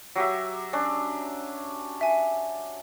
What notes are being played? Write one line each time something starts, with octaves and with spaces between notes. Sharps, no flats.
F#3 G4 E5
C#4 D4
E5 G#5